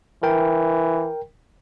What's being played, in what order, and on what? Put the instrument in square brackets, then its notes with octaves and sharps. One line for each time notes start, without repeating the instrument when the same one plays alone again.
[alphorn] E3 [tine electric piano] A#4 G5